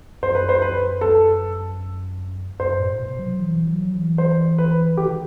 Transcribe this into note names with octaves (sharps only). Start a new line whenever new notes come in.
F#2 C5
B4
C5
B4
A4
F#2 C5
A2
B2
F#3
E3
F#3
E3
C5
B4
D#3 G4